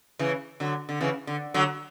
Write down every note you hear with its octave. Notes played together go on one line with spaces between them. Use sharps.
C#3 E3
D3 F#3
D3
C#3 E3
D3
D3 F#3